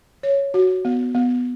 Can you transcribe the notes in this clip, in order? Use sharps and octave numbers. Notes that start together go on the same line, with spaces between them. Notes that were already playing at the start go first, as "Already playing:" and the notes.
C#5
F#4
B3
B3